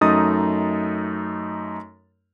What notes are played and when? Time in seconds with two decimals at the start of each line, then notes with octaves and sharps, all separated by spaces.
0.01 F#2 A3 D#4 D#5 D#6 A6